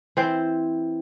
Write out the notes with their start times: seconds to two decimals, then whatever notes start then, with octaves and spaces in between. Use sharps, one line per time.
0.17 E3 C4 C5